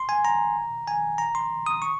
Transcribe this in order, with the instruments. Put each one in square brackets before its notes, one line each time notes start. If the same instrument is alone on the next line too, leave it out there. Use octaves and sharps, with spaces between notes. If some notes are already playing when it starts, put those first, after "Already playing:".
Already playing: [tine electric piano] C6
G#5
A#5
G#5
A#5
C6
D#6
C#6